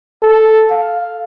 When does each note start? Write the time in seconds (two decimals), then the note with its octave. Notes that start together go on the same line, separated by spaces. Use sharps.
0.22 A4
0.71 F5